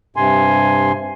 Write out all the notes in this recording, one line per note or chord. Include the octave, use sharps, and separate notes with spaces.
G2 C3 G#5 C6